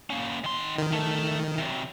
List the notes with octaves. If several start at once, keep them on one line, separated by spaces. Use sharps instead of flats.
A#3 C#4
D#3 C6
D#3
A3
C3 F#3